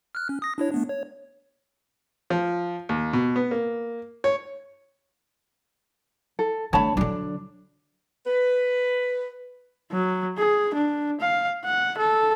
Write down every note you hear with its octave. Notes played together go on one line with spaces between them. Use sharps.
F6 F#6
C#4
D#6 A#6
D4 E4 C#5
A3 B3 D4
C#5
F3
D#2
B2
B3
A#3
C#5
A4
D3 A3 C#5 A5 B5
D3 F#3 D4
B4
F#3
G#4
D4
F5
F#5
A4